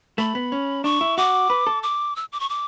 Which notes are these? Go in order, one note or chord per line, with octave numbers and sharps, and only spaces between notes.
A3 B5
B3
C#4
D4 C#6
E4
F#4 D6
B4
A4
D6
E6
D6
C#6
D6